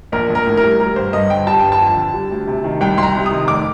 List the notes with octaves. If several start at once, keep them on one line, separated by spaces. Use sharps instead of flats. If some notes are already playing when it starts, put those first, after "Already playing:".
A#1 A#4
A#1
A#4
A2
A#4
G3
G3 A#4
G1 C5
G2 D#5
D3 G5
G3 A5
G1 G5
A5
F2
D3
G3
D2
C3
D#3
C2 G5
C2 C6
A#5
C3
D#3 D#6
F1 D6